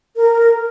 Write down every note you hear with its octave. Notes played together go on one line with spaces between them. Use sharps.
A#4